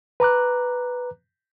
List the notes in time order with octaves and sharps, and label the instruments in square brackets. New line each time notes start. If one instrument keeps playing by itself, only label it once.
[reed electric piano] B4 A#5 D6 F#6